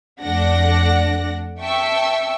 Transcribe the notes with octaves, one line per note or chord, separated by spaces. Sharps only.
F2 A3 D4 D5 F#5 A#6
E5 G5 A5 C#6 E6